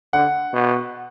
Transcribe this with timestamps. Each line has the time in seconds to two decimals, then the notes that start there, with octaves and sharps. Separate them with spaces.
0.13 D3 F#5
0.53 B2